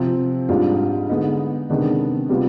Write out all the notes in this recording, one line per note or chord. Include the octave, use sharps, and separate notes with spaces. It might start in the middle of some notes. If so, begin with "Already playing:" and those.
Already playing: C3 F3 C4 F4
G#2 G3 D4 F4
D3 G#3 B3 D#4
C3 D#3 G#3 B3 D4
C3 G3 B3 F4